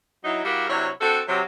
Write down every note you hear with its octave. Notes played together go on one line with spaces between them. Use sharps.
F#3 D#4 E4
G3 E4 F#4 G4 A#4 F5
C3 F#3 D4 E4 C#5
C4 D4 F#4 A4
C3 F#3